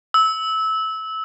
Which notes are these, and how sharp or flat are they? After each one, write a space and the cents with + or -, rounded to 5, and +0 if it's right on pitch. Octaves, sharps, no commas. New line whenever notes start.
E6 -20